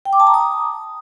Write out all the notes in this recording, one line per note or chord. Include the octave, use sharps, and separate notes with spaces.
G5
D6
A5
A#5
D#6